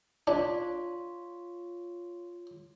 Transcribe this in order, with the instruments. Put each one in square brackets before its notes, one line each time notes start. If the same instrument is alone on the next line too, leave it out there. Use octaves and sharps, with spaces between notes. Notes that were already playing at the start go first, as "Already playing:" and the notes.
[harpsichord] D4 [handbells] F4 C#5